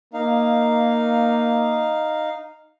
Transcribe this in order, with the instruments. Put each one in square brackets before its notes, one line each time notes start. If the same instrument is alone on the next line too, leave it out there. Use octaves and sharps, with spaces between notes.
[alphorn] A#3 [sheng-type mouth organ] D#4 F5